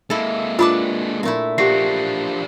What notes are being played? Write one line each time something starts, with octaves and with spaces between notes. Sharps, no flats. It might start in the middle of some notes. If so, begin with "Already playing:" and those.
G#3 A#3 E4 A4
D4 F4 B4 A5 B5 D6
A#2 A3 E4
F3 D4 F#4 G4 C7